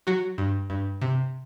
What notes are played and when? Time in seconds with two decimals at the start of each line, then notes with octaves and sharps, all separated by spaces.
0.07 F#3 F#4
0.38 G2
0.70 G2
1.01 C3